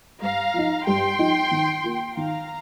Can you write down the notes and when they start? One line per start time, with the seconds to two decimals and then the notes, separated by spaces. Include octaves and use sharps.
0.21 G2 F5 A#5
0.54 F3 D#4
0.86 G2 G5 C6
1.18 F3 D#4
1.51 D#3
1.84 A#3 F4
2.16 D#3 F5 A#5